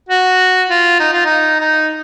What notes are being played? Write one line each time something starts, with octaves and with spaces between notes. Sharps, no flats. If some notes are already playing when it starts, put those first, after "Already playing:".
F#4
F4
D#4
F4
D#4
D#4